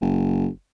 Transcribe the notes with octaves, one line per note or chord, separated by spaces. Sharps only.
F#1